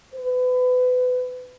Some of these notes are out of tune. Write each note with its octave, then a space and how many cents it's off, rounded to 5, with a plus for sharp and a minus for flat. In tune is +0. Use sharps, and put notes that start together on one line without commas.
B4 +30